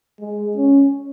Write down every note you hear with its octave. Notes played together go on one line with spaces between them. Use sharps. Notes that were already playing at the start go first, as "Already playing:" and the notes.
G#3
C#4